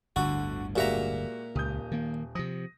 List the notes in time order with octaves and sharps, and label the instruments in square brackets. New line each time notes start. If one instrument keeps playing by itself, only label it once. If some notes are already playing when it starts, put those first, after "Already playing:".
[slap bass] G1 D2 A2 [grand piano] D3 [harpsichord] F#4
[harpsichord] A#2 E5 A#5 [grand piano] G#3 F#4 G4
[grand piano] D#1 D#6 G6 [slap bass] C#2
[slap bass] D#3 A#3
[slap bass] C3 F3 [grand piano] D#6 A#6